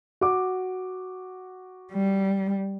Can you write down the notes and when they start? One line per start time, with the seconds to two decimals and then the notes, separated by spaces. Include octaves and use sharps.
0.21 F#4 D6
1.93 G3